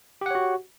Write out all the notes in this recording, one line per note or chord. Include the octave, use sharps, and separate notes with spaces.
F#4 G4 C#5 F#5